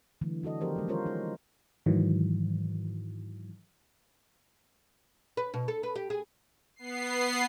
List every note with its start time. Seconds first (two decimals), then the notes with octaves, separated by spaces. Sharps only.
0.21 D3 E3 F#3 A3
0.43 D4 F#4 A4 D#5
0.61 D#3 F3 B3 G4 A#4 C5
0.76 F#3 G#3 B3
0.88 G#3 C#4 F4 A#4 C5 C#5
1.06 D#4
1.86 G#2 D#3 E3 F#3
5.37 B4
5.54 B2
5.68 A4
5.83 B4
5.96 G4
6.10 G#4
6.76 B3 C7